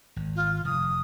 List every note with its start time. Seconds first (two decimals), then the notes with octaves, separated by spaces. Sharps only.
0.16 G#1
0.36 F4
0.65 F1 D#6